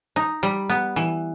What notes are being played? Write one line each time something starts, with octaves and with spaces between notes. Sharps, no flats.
D#4
G3
B3
E3